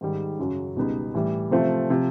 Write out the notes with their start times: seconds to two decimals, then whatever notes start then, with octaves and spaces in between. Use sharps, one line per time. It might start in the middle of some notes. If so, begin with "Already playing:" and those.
0.01 G#2 D#3 G3
0.39 F#2 C#3 F#3
0.76 C#2 B2 G3 B3 D#4
1.14 A2 E3 G3
1.51 C3 F3 A3 C4
1.90 C3 F3